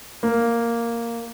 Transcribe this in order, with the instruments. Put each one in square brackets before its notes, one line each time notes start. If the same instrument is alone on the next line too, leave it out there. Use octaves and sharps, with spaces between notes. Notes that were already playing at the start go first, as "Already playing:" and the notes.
[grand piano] A#3